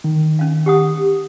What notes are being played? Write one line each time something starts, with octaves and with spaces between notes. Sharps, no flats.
D#3
C#4 F5
G4 F#5 D#6